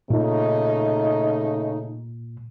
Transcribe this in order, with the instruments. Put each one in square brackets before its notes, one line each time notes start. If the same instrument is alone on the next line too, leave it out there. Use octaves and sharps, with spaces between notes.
[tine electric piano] A#2 [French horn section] C#3 A3 D#4